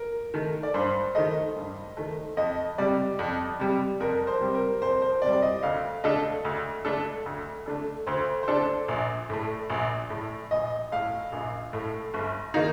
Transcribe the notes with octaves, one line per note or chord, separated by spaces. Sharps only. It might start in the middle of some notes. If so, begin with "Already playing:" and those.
Already playing: A#4
D#3 A3
D5
G2 C5
D#3 A3 D#5
G2
D#3 A3
F2 D#5
C3 G3 D5
F2
C3 G3
F2 A#4
C5
C3 G3
A#4
F2 C5
C5
C3 G3 D5
D5
D#5
D2 F5
D3 A3 D4 A4 D#5
D2
D3 A3 D4 A4
D2
D3 A3 D4 A4
D2 C5
C5
D3 A3 D4 A4 D5
A#1
A2 A3
A#1
A2 A3
A#1 D#5
A2 A3 F5
A#1
A2 A3
G1
D#3 A#3 D#4